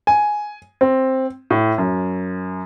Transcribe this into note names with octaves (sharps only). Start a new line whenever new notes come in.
G#5
C4
A2
F#2